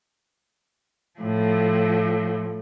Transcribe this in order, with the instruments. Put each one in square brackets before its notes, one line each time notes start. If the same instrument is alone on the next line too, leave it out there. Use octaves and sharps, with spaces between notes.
[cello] A2 F3